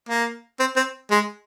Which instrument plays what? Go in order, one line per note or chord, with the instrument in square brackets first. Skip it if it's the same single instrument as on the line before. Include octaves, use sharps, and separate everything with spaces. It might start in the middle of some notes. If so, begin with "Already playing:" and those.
[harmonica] A#3
C4
C4
G#3